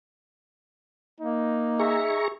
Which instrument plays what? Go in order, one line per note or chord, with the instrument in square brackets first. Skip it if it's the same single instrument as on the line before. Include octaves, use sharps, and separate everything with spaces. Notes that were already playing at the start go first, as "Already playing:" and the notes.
[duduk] A#3 [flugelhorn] D#4
[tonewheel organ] G#4 A#5 C#6 [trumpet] E5